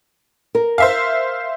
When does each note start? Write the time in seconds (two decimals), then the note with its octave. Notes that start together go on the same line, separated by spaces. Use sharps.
0.55 A#4
0.78 C5 E5 F5